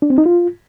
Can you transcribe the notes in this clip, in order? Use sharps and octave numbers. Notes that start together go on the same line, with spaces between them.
D4
C4
D#4
F4